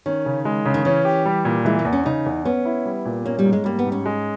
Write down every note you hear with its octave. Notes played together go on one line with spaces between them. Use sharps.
D#3 C#4
C#3
G#3
C#3
D#3
E3 C#4
G4
G3
A#2
E3 G#3
A#3
E2
C#4
C#3 D#4
E2
B3 C#4
E4
G3
A#2
A#3 C#4
G3
G#2
G#3
G3 A#3
B3
G#2
C#4
G#3